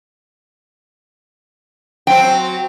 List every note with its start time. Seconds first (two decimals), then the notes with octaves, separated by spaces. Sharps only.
2.07 F#3 C4 G5